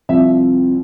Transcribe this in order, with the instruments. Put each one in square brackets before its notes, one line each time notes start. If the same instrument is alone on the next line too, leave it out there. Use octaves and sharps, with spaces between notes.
[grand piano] C2 C3 F3 E5